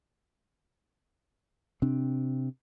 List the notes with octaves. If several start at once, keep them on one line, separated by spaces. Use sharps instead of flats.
C3 C4 D4